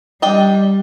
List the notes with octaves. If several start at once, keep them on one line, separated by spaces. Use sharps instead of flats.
G3 D4 D#5 G5